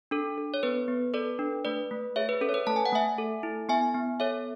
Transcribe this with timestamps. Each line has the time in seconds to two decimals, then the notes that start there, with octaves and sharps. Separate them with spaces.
0.11 D4 A4
0.38 A4
0.54 C#5
0.63 B3 B4
0.88 B3
1.14 A4 B4 D5
1.39 D4
1.65 A3 B4 D5
1.91 A3
2.16 G#4 C#5 E5
2.29 B4
2.41 C#4 A4
2.49 C#5
2.54 B4
2.67 A3 A5
2.76 G#5
2.86 F#5
2.92 A3 E5 G#5
3.18 A4
3.43 E4
3.69 B3 E5 G#5
3.95 B3
4.20 A4 C#5 E5